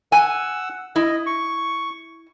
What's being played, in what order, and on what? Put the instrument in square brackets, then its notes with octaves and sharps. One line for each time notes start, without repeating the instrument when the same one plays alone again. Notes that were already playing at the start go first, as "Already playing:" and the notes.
[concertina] F#5 E6 [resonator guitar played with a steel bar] G#5
[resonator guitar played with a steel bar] E4 [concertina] D#5
[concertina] C#6